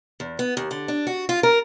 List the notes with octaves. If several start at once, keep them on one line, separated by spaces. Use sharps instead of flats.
E2
B3
D#2
D3
D4
F#4
F4
A#4